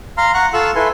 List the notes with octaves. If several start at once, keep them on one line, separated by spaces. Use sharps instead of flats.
F5 A#5 C6 F6
F#5 A#5 C#6 F#6
F4 A4 F5 C#6 E6 F#6
E4 A4 B4 G#5 C6